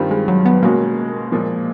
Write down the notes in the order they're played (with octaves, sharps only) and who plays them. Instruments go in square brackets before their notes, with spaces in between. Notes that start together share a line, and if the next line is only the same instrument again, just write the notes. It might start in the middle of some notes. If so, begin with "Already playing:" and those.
Already playing: [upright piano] G2 D#3 G3 C4 F4
[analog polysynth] G#3
F#3
B3
[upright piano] B2 G#3 C#4 F#4 [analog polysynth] A#3
[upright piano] A#2 F3 G#3